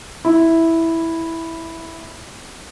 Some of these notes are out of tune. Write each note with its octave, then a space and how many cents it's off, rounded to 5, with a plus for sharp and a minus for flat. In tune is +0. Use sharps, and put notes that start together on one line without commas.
E4 -5